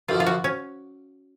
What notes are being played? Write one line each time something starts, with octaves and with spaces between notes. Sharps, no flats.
F#2 D3 F3 F4
F4
F#4
C#4